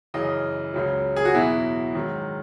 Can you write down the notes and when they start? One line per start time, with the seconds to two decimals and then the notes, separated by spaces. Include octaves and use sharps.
0.14 F#2 C#3 E3 D#5
0.74 C#2 C#3 F#3
1.16 G#4
1.25 F#4
1.34 E2 B2 F#3 E4
1.95 G#2 D#3 F#3